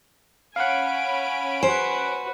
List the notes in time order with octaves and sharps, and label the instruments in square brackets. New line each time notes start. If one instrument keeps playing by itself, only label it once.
[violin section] C#4 B5 D7 [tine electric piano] F5 F#5 [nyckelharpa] G#5
[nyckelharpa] F#4 B4 [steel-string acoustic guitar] C5 [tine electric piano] G#5